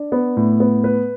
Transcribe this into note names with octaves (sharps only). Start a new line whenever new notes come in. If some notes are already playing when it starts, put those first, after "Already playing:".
Already playing: D4
B3
A2
B3
B4